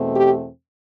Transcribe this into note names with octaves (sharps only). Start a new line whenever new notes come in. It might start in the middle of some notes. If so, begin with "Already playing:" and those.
Already playing: E2 B2 A3 C4
G4